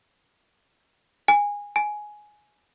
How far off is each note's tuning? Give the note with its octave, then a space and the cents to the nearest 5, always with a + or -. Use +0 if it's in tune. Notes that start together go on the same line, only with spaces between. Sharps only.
G#5 -20
G#5 +10